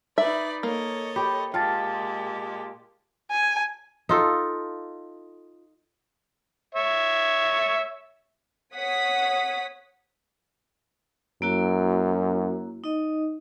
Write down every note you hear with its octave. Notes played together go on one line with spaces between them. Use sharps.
D#4 B4 D5 E5
A#3 A4 C#5 D#5
G4 B5
A#2 G#3 F4 G4 G5 A5 A6
G#5
D#4 F4 A4
C#5 E5
C#5 F#5 D#6 B6
F#2 A#3 E4 F#4
D#4 D#5